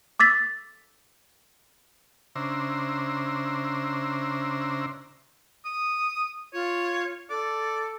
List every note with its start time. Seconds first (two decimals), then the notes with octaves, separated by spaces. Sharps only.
0.20 D6 E6 A6 B6
2.36 C#3 D4 C5 E5 A#5
5.65 D#6
6.54 F4 C#5
7.30 A4 D5